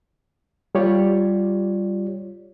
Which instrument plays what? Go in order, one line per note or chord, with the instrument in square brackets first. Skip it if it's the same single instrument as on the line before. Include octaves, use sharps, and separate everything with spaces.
[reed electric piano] G3 F4 G4 C#5 D5